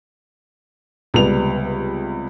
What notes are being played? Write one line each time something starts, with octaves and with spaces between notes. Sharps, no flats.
C#2 C3 G3 B3 F7